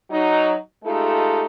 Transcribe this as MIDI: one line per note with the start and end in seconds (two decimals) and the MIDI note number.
0.11 0.56 54
0.11 0.56 63
0.85 1.45 56
0.85 1.45 57
0.85 1.45 63
0.85 1.45 65
0.85 1.45 67
0.85 1.45 69